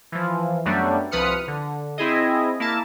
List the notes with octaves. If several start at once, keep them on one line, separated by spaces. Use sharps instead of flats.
E3 F3
F#2 F#3 G3 A3 B3 D4
C2 F3 B4 D#6 F6 C#7
D3
C4 E4 G#4 D#5
A#3 E4 A5